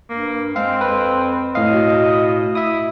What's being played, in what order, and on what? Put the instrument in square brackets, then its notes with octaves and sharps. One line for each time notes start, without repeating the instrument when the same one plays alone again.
[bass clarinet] G2 [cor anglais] A#3
[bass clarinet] G#3 [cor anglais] C4 [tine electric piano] F5
[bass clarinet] F2 [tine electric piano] B4
[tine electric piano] A2 F5 [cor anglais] D#5
[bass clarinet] B2
[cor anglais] E4 [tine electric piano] E5 D#6